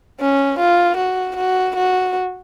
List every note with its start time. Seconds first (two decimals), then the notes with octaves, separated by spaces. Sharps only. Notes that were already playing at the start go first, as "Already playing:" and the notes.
0.20 C#4
0.59 F4
0.97 F#4
1.36 F#4
1.76 F#4